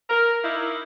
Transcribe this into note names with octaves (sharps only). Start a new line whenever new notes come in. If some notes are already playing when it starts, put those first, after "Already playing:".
A#4
A#3 D#4 E4